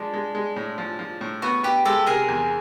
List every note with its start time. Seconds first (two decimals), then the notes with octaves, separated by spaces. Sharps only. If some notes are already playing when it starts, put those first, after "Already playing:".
Already playing: F3 G#3 D4
0.14 G#3
0.35 G#3
0.56 A2
0.78 F3
0.99 F3
1.21 A2
1.42 B3 F#4
1.63 B3 G4
1.85 G#3 G4 A4
2.06 C3 G#4 A#4
2.29 E2